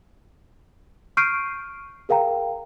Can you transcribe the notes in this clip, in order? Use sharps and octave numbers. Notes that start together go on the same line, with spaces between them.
C#6 F6 G6 C7 D7 D#7
G#4 A#4 F5 G5 A#5